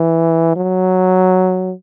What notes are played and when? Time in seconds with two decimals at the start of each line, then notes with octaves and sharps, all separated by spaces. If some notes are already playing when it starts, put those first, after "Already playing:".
Already playing: E3
0.56 F#3